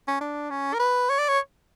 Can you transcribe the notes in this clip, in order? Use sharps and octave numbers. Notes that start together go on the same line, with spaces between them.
C#4
D4
C#4
A#4
B4
C#5
D5
C#5